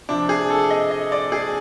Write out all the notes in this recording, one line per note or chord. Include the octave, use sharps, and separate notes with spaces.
C3 F3 D4
G#4
A4
D#5
D#5
D5
G#4